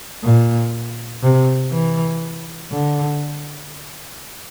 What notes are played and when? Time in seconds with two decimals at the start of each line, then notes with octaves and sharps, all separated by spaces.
0.24 A#2
1.23 C3
1.72 E3
2.72 D3